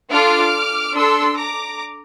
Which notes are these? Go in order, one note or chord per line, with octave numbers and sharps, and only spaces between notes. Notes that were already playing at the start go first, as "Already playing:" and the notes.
D4 F4 A4 D6 F6
D4 A4 C6 E6
A#5 D6